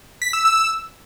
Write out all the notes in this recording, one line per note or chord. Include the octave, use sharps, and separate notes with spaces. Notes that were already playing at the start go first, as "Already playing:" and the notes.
B6
E6
E6